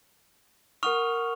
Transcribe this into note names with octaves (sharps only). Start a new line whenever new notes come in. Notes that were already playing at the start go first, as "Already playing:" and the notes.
A#4 F#5 C#6 D#6 F6 F7